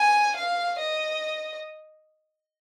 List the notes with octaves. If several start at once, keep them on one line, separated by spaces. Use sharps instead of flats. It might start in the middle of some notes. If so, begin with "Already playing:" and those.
Already playing: G#5
F5
D#5